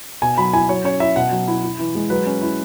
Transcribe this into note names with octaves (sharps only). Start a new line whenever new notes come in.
B2 G#5
F#3 B5
E4 G#5
F#3 C#5
C#4 C#5
E4 E5
B2 F#5
F#3
E4
E4
E3
G#3
F#3 B4
C#4
E4